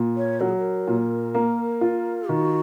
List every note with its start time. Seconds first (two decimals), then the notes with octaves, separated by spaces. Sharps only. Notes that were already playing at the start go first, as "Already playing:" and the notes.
Already playing: A#2
0.16 C#5
0.40 F#3 A#4
0.49 G#4
0.58 A#4
0.87 A#2
1.35 A#3
1.81 F4
2.28 D#3 F#4